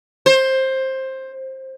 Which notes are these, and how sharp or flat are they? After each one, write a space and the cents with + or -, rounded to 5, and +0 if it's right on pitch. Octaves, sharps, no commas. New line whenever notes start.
C5 +15